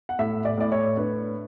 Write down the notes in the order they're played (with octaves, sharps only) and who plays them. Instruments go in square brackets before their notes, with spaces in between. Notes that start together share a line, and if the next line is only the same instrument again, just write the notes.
[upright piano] F#5
A2 E5
D5
A2 D5
C#5
D4 B4